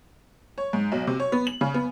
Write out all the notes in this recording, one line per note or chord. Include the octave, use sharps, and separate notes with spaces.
C#5
G#2
B1
C3
C#5
B3
F#7
C#3
B3